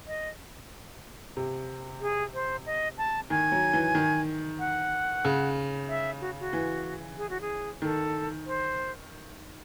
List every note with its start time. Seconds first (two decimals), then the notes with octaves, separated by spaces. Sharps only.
0.07 D#5
1.37 C3
2.01 G#4
2.34 C5
2.66 D#5
2.98 A5
3.30 D#3 G#5
3.52 F#3
3.73 E3
3.95 D#3
4.59 F#5
5.25 C#3
5.88 E5
6.21 F#4
6.40 F#4
6.53 E3
7.18 G#4
7.30 F#4
7.41 G#4
7.82 D#3 A4
8.46 C5